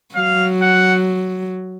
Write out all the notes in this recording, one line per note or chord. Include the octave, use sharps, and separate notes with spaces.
F#3 F5
F#5